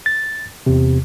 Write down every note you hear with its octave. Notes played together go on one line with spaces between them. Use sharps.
A6
E2 C3